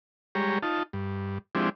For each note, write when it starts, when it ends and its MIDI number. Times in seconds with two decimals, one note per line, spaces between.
0.35 0.58 55
0.35 0.58 56
0.35 0.58 67
0.35 0.58 73
0.35 0.58 82
0.63 0.83 63
0.63 0.83 65
0.63 0.83 81
0.93 1.38 43
1.55 1.69 53
1.55 1.69 56
1.55 1.69 60
1.55 1.69 62
1.55 1.69 64
1.55 1.69 67